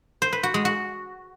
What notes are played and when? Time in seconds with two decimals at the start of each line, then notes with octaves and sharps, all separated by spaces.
0.22 C5
0.33 B4
0.43 F#4
0.54 G#3
0.65 F#4